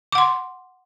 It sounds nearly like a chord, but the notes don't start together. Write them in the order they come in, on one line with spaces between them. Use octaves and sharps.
D6 F#5 C6